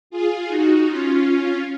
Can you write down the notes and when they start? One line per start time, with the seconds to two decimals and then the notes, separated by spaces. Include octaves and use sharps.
0.10 F4 G#4
0.48 D#4 F#4
0.86 C#4 F4